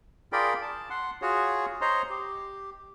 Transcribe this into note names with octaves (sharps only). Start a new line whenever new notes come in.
F4 G#4 A#4 D5 G5 B5
A5
F#5 C6
F4 F#4 G#4 C#5
C5 C#5 D#5 A#5 C6
G4